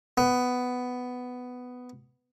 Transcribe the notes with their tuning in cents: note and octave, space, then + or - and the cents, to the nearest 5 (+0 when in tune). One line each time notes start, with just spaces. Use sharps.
B3 +10